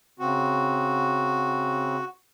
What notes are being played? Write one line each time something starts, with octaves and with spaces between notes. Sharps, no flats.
C#3 C4 F#4